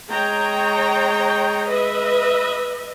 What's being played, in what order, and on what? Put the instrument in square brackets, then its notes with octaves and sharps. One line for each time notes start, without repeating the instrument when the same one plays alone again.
[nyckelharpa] G#3 [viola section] C#5 G5 A#5
[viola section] B4 D#5 E5